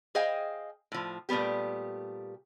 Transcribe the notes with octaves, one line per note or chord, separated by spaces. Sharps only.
G#4 C5 D#5 F5 G5 G#5
A2 F3
A#2 G3 A3 B3 G4